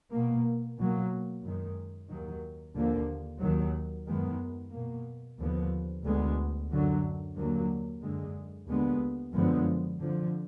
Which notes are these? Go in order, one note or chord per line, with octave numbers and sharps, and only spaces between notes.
B2 A#3
B2 F#3 A#3
F#2 D#3 G#3
D#2 D#3 F#3
D#2 D3 F3 A#3
D#2 D#3 F#3
F#2 D#3 G#3 B3
B2 A#3
D#2 D3 F3 B3
D2 D3 G#3 B3
F#2 D3 F#3
D#2 D3 F#3 A#3
F#2 D3 G#3
D#2 D3 G#3 B3
F#2 D3 F3 G#3 B3
F2 D3 F3